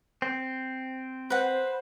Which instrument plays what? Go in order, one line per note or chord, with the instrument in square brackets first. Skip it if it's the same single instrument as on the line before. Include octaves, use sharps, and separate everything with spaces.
[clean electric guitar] C4
[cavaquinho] B4 F#5 [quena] C5